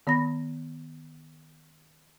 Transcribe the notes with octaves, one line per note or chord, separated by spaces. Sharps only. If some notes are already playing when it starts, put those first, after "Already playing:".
D#3 B3 B5 A#6